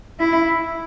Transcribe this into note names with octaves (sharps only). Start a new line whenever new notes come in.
E4